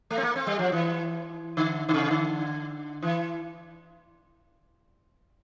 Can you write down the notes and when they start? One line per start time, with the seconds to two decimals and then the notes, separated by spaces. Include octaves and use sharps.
0.10 A3
0.18 C4
0.23 A#3
0.36 C4
0.47 G3
0.59 F3
0.72 E3
1.57 D3
1.89 D3
1.94 C3
2.11 D3
3.02 E3